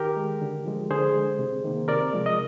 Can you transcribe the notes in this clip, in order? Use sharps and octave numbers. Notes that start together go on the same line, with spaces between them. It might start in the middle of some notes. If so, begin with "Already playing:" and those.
Already playing: D#3 G4 A#4
G#3
D3
F3 G#3
D3 G#4 C5
G#3
C3
D#3 A#3
C3 A#4 D5
F3 G#3
D#5